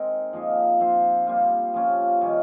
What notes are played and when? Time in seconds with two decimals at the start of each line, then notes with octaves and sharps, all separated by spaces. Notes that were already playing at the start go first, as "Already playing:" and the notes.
Already playing: G#3 C4 D#4 A#4
0.33 F3 A#3 D#4 G#4
0.80 F3 C4 F4 C5
1.27 G3 A#3 F4
1.74 F3 A#3 C#4 G4
2.21 D#3 G3 C#4